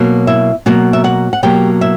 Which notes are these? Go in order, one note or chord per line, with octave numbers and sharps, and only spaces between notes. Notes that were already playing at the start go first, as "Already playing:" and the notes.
Already playing: B2 F#3 A#3
E4 E5
B2 F#3 A#3 F#4 F#5
E5
F#4 F#5
F#5
B2 F#3 A#3 G4 G5
E4 E5